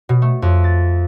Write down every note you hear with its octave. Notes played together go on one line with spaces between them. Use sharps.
B2
A3
F2
A6